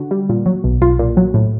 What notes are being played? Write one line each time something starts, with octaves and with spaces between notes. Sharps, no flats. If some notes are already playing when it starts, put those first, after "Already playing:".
Already playing: D3 F#4
G3
A#2
F#3
B1
B1 F4
A#2
F#3
A2